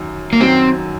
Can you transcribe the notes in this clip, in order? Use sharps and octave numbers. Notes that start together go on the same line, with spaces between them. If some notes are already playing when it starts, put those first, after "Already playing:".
Already playing: F#2 D#3 F#3
A#3
F#2 D#3 F#3 C4